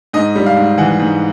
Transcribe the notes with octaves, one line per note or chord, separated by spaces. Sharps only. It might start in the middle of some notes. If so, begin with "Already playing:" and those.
G#2 D#5
G3
F5
G#2
E3 F#5
G#2